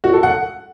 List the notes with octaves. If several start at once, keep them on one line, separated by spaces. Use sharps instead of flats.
F#4
A4
F#5